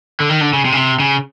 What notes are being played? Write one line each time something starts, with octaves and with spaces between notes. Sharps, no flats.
D3
D#3
D3
C#3
C3
C#3
C3
C#3